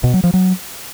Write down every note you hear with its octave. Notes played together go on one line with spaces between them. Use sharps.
B2
F#3
F3
F#3